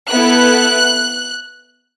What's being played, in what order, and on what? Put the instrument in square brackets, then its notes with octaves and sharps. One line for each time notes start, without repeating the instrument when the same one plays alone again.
[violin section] B3 E4 A4 F#6